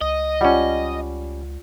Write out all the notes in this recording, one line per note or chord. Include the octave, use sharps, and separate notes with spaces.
C#2 D#5
G3 C#4 F4 D5 F#5